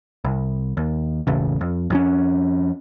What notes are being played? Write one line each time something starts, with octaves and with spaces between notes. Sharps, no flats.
C2
D#2
E1 A1 C#3
F2
F2 E3 C#4